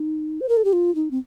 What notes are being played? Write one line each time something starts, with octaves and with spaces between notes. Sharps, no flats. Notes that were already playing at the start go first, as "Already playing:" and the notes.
Already playing: D#4
C5
A#4
A4
G4
F4
D#4
C4